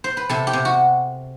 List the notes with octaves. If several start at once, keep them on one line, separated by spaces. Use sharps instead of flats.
C5
B4
C3 A4
G4
C3
F#4